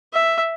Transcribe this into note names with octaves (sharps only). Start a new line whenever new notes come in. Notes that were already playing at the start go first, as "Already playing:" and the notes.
E5